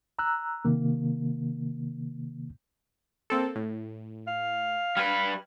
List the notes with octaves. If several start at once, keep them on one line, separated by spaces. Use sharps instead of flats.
A#5 E6 F#6
C3 D#3 A#3
A#3 C4 A4
A2
F5
G3 B4 F6 G#6